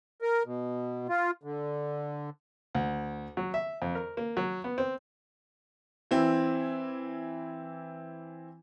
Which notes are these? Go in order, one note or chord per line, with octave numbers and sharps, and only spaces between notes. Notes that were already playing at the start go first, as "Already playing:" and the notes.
A#4
B2
F4
D3
D2
F#3
E5
F2
A#4
A#3
F#3
B3
C4
E3 C4 E4